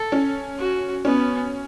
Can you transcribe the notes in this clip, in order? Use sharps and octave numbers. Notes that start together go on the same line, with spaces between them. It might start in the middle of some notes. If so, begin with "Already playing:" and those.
Already playing: A4
C#4
F#4
B3 C#4